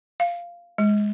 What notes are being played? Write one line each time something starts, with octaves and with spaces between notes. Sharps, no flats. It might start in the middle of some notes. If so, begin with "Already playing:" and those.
F5
G#3